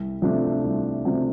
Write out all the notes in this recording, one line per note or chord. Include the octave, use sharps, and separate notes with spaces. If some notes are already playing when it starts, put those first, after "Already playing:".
Already playing: C2
C3 F3 A3 D4
C2
C3 F3 A3 D4